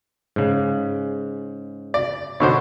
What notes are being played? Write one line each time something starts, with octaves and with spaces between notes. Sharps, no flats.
G#2 C#3
D5
B2 D3 C5 C#5